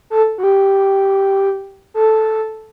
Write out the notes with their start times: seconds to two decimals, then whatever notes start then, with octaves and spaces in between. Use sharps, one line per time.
0.10 A4
0.38 F#4
0.43 G4
1.94 A4